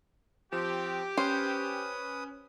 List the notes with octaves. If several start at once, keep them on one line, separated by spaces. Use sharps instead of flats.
F3 C4 G4
C#4 B4 C5 D#6